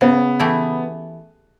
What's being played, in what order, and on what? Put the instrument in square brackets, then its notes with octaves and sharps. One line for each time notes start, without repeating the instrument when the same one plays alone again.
[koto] C#3 [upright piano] B3
[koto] E3 A3 E4 G4